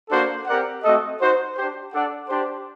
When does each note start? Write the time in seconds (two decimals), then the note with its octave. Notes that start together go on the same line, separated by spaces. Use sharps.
0.09 A#3 D4 F#4 A4 C5
0.46 C4 G4 A#4 D5 F#5
0.82 A3 C4 F#4 A4 D#5
1.19 D#4 F#4 C5
1.56 D4 G4 C5
1.91 D4 A4 D5 F#5
2.28 D4 G4 C5